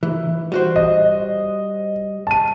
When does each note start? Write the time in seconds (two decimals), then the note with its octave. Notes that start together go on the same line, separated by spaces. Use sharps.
0.03 E3
0.52 G3 F#4 C5
0.76 D#5
2.27 A5 D#7